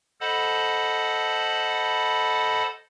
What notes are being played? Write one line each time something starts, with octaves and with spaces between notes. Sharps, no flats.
A4 C5 D#5 F#5 A5 B5